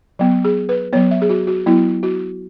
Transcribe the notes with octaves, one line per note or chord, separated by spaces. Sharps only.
F#3 B3
G#4
B4
F#3 B3 C#5
E5
G#4
F#4
F#4
F#3 B3 E4
F#4